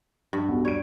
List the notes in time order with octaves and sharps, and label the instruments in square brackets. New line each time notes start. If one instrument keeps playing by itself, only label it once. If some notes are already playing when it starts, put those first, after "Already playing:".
[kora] G2
[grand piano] B1 F#4
[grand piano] G3 D7 [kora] C#5